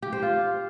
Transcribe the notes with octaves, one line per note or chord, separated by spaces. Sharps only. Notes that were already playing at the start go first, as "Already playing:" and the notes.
G4
C5
F4